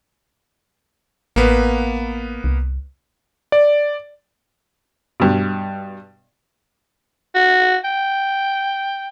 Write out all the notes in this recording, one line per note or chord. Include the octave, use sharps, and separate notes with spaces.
A1 A#3 B3 B4
C2
D5
G2 B2
F#4
G5